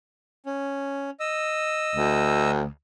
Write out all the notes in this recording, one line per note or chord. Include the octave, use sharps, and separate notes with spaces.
C#4
D#5 E6
D2